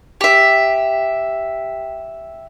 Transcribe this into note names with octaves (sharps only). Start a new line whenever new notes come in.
G4 E5